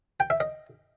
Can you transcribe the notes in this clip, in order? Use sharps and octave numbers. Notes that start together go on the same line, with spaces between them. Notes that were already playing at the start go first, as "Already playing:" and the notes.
G5
E5
D#5